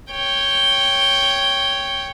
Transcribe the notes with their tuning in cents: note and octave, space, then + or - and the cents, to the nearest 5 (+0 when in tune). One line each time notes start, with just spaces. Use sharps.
C#5 +0 G5 +0